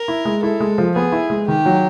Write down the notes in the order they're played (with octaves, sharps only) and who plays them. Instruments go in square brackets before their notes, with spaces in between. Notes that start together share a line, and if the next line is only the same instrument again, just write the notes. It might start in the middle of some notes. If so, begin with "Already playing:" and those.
Already playing: [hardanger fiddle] A#4
[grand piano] E4
G#3
[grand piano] E4 [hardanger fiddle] A4
[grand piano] G#3
F3
[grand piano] B3 [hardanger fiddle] G#4
[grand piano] E4
G#3
[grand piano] D#3 [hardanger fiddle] G4
[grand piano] F#3